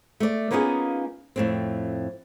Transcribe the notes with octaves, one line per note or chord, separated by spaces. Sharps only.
A3 D5
A#3 B3 C#4 D#4 F4 G#4
F2 A2 C4